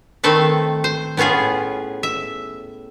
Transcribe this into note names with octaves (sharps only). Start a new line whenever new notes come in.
D#3 A3 C4 A4 B4
C5
A2 B3 C#4 F4 G#4
E5